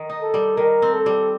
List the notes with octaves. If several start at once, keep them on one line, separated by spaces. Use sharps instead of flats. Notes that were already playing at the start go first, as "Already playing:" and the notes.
Already playing: D#3
D#4
A4
G3
D#3 A#4
C4
A4
G3